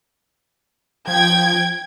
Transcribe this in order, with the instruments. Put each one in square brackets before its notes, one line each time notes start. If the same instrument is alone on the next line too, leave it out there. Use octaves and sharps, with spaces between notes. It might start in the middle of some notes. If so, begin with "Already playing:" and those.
[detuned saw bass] F3 [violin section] G5 G#6